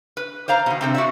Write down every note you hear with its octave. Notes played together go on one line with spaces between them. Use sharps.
B4
C5 D5 F5 A#5
B2 D#3
C3 C4 A4
F#4 D5 E5